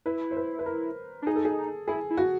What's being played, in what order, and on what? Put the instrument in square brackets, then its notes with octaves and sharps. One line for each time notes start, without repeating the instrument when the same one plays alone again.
[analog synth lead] E4 [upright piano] B4
[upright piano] C5
B4
B4
A#4
[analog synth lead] D4
[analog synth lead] D#4 [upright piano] G#4
[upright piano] A4
G#4
[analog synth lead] E4 [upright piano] G#4
[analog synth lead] E4
[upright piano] F#4